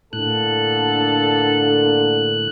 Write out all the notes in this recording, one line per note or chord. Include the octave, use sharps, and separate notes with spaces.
A2 D3 A#3 A4 F#6